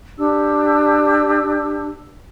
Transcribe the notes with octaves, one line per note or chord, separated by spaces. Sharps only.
D4 G4 E6